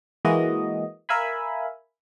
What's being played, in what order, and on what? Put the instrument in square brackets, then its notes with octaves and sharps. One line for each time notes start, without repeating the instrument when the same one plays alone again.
[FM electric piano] E3 G#3 A#3 F#4 D#5
A#4 E5 F5 G#5 B5